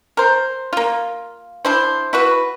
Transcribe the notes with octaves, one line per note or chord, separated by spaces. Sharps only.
A#4 C5
A#3 F4
D4 E4 C5
E4 F#4 B4